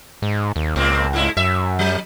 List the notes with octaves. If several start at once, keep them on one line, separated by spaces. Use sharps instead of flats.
G#2
D#2
C#2 A2 A#3 C4
G#2 C3 E4
F#2 E5
F#3